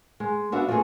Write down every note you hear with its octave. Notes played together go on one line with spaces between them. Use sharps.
G#3
B3 D4 F#4 E5 F5
F3 A3 B3 C4 G#4